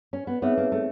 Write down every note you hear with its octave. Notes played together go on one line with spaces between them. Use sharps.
C#4
B3
B3 C4 D#4 G#4 C#5 E5
A#3
A3